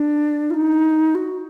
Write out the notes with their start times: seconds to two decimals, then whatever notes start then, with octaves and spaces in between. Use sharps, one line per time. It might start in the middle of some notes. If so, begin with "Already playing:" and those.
Already playing: D4
0.50 F4
0.54 D#4
1.15 F#4